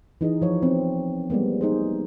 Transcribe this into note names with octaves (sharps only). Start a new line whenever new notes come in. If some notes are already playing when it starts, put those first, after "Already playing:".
E3 D#4 G#4 D#5
F3 C#5
B3 C4
G3 G#3 A#3 B3
D#4 G#4 C5